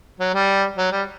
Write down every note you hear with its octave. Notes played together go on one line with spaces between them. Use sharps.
F#3
G3
F#3
G3